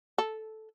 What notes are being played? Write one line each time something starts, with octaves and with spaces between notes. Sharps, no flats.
A4